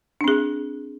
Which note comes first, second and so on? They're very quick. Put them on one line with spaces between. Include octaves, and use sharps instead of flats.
D4 C4 G#4